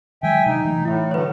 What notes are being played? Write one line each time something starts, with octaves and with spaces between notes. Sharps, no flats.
D#3 F#3 G#3 E5 G5 G#5
C3 F#3 D4 D#4
E3 A3
A2 E4 E5
D3 F#3 B4 C#5